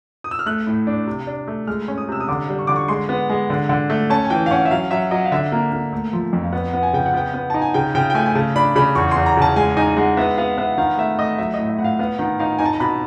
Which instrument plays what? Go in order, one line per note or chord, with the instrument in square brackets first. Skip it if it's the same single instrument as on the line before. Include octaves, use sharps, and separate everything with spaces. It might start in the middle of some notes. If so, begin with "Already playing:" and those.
[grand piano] D#6
E6
F6
A3 F#6
A2
D4
C3
D4
A3
G#3 F6
C#4
D#6
C3 E6
D#6
D3 D6
G3
C#6
D3 D6
C#6
G#3 C6
B3
G#3
D3
D3
A3
C#4 A5
G#5
E3 G5
F5
C#4 F#5
E5
F#3 F5
F#3 E5
F#3 D#5
F5
D3 E5
A#3
A#3
A3
F3
F2
F5
B3 F#5
B3
G#5
C#3 G5
F#5
B3 G5
B3
D#4 A5
G#5
C#3 G5
C#3 G5
G5
A3 G#5
G#5
C#3 A5
D4 B5
C#3 B5
E2 C#6
E2 C6
A#5
C#3 A5
G#3 G#5
D#4 G#5
G#3 F#5
B3 E5
B3 F5
B3 E5
F#5
D#3 F5
A3 E5
A3 D#5
F#3 E5
D#5
A2
E5
A2 F#5
F5
B3 F5
D#3 F#5
D#4 F5
D#4 G#5
A5
A#5
B2 B5